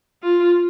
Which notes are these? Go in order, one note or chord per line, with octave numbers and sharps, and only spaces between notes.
F4